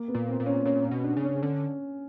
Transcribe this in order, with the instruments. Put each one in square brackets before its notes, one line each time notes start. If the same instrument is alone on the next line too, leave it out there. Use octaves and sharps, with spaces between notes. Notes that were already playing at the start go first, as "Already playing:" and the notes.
Already playing: [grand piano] A#3
B3
[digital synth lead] A#2
[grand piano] C4
[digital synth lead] A#2
[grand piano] C#4
[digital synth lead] A#2 [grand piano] C#4
[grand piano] C#4
[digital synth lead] B2
[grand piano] D4
[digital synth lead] C#3
[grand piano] C#4
[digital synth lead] D3 [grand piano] C#4